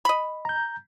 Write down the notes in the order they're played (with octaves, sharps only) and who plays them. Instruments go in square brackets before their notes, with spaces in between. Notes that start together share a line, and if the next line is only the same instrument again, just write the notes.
[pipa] D#5 B5
[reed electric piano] A#5 G6